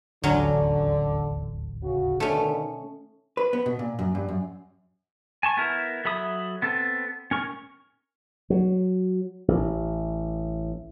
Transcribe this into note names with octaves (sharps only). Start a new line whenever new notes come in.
D#1 A1 D2 D3 F#3 C#4
C#3 F#4
B2 D3 D#3 A3 C#4
B4
B3
B2
A#2
F#2
G2
F#2
G#5 A5 C#6
B3 E4 A#4
F#3 A4 E5 B5 D#6
B3 C4 A4
C#4 A#4 C#6
F#3
A1